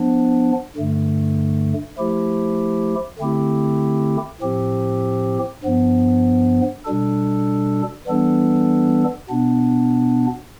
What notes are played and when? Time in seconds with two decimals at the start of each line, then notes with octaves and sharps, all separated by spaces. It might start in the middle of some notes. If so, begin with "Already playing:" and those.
Already playing: F3 B3 D4
0.76 G2 D3 A3
1.98 F3 A3 E4 G4
3.19 D3 A3 C4 E4 G4
4.41 A2 F3 C4 G4
5.63 G2 F3 B3
6.85 B2 G3 D4 A4
8.07 E3 G3 B3 D4 A4
9.29 B2 B3 D4